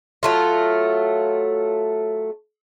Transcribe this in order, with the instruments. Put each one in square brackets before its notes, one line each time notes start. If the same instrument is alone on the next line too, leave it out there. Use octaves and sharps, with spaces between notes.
[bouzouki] F#3 A3 F4